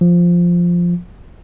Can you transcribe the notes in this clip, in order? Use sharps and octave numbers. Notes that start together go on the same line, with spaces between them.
F3